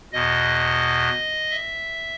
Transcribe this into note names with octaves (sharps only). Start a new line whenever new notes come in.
E2 B2 D#5
E5